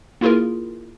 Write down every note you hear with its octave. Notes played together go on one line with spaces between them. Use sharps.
A#3 E4 F4 G#4 A#4